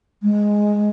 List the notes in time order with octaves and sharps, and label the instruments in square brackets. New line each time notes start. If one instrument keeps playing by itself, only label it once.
[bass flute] G#3